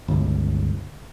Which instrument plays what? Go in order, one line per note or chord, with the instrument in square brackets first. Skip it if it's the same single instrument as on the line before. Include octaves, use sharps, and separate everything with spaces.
[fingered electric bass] G1 C#2